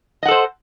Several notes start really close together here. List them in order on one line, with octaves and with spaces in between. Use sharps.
D#5 F#5 A4 C5